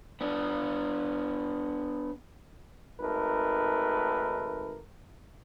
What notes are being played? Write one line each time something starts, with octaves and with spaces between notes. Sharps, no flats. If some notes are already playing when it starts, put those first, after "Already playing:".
B3 D4
G#1 D#3 A3 A#4 B4